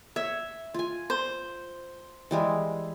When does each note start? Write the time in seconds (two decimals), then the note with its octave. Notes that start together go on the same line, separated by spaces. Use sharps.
0.16 C#5 E5
0.74 F4 G#5
1.10 C5
2.31 E3 G3 G#3